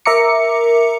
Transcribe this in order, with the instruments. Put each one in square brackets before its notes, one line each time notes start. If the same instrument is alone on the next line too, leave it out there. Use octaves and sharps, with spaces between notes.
[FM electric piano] A#4 E5 A#5 D6 C#7